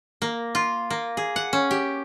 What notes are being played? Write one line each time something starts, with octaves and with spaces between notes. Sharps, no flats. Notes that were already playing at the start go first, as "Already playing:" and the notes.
A#3
F4
A#3
G#4
F#5
C#4
G4